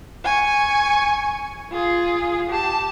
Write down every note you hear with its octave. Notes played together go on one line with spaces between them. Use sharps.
G#5 C#6
F4 G#4
G4 A5